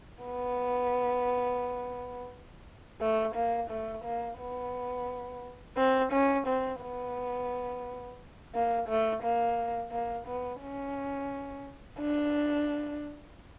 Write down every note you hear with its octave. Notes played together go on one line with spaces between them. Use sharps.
B3
A3
A#3
A3
A#3
B3
C4
C#4
C4
B3
A#3
A3
A#3
A#3
B3
C#4
D4